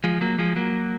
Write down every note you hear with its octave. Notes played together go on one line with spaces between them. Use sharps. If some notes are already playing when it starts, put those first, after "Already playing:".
F3 G#3
F#3 A#3
F3 G#3
F#3 A#3